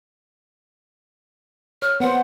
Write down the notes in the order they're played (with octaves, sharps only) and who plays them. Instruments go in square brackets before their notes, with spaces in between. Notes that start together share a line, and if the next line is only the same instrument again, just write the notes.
[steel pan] C#5 [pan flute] F6
[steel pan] B3 C5 [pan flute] F#5